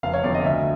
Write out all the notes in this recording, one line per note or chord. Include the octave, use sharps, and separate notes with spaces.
F1 F5
C#5
F2 D3 D5
D#5
D2 E5